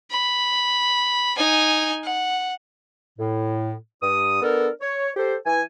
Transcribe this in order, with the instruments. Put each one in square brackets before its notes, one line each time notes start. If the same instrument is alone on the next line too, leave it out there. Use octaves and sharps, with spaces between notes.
[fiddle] B5
D#4 G#5
F#5
[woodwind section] A2
G2 D#6
B3 D4 A4 A#4
C#5
G4 A4 C5
E3 G#5